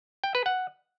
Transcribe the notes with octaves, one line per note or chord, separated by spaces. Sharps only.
G5
B4
F#5